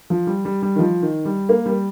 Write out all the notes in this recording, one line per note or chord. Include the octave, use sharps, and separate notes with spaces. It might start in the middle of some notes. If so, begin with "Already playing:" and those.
F3
G3
G3
G3
D#3
F3
D#3
G3
A#3
G3